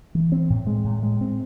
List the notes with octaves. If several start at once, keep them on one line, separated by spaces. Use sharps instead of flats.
E3
C4
A2
G#3
A2
G#3
C4